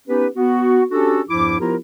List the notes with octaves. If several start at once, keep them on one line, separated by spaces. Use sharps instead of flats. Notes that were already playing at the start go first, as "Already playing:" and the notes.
B3 C#4 D#4 G4 B4
B3 F#4
C#4 D4 F#4 G4 A4
E2 G2 F3 E4 D6
F3 B3 E4 F4 G4 A#4